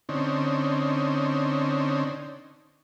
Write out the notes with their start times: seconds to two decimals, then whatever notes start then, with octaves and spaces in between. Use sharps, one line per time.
0.09 D3 C4 C#4 D#4